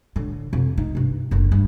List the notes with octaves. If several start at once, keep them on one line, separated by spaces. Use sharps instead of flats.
A2 D3
F2 C3
D#4
G2 C3
F#1 D3
G2